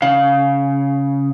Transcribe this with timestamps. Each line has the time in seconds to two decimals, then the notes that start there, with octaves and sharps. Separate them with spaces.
0.02 C#3 F5